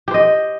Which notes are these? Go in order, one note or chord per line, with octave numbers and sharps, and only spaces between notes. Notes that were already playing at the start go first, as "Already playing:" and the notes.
G4 C5 D#5